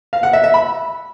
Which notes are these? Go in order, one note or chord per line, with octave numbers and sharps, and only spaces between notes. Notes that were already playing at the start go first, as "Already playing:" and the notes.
F5
F#5
E5
E5
B5